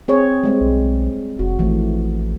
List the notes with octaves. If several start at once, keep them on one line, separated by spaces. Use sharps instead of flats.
C4 G#4 C#5
G3 G#3 C4
B1
F1 F#4
A1 E3 F3 A3